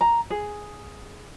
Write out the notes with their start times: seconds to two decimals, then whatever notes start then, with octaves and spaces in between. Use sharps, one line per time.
0.01 A#5
0.30 G#4